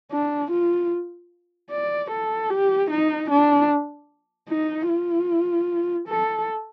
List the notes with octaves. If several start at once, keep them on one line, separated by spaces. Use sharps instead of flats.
D4
F4
D5
A4
G4
D#4
D4
D#4
F4
A4